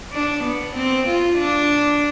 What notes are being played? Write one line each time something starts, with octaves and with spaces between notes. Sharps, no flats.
D4
B3
C4
F4
D4